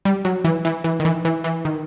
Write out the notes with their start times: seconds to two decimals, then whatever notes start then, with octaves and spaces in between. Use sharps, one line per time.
0.05 G3
0.25 F#3
0.45 E3
0.65 E3
0.84 E3
1.00 D#3
1.05 E3
1.25 E3
1.44 E3
1.65 D#3